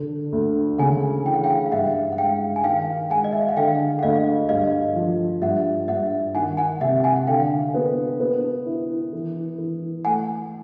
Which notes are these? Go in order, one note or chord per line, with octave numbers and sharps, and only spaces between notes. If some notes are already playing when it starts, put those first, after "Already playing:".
Already playing: D3
D2
C#3 F#5 G#5
E3 G5
F#5
F5 G5
F5
G2 E5 F#5
F#5
G#3 F5 G5
G#5
D#3 F5 G5
G#3 F#5 G#5
D#5
E5
F5
F#5
D3 F5 G5
F#5
D2 D#5 F5
G2 D#5 F5
F3
G2 E5 F#5
G2 E5 F#5
D#3 F#5 G#5
F#5 G#5
C3 E5 F#5
F#5 G#5
F#5
D3 F5 G5
B3
B3
E4
E3
E3
A3 F#5 G#5